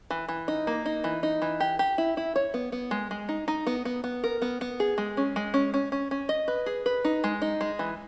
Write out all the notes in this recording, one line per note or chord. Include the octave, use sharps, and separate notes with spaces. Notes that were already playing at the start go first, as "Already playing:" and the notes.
E3
E3
D#4
A#3
D#4
E3
D#4
E3
G4
G4
E4
E4
C#5
B3
B3
G#3
G#3
D#4
D#4
B3
B3
B3
A#4
B3
B3
G#4
G#3
C#4
G#3
C#4
C#4
C#4
C#4
D#5
B4
G#4
B4
D#4
G#3
D#4
G#3
E3